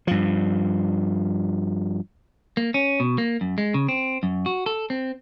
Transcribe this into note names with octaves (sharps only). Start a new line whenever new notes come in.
G2 F3
A#3
C#4
B2
A#3
F#2
G#3
C#3
C4
F#2
F#4
A4
C4